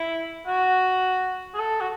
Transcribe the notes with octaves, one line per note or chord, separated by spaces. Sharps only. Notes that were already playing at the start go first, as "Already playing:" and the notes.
Already playing: E4
F#4
G#4
A4
F#4